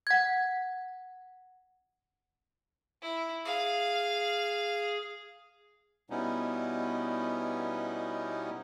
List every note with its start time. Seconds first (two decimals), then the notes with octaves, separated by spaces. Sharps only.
0.07 F#5 G#6
3.02 E4
3.45 G#4 F5
6.10 B2 G3 B3 C#4 D#4 E4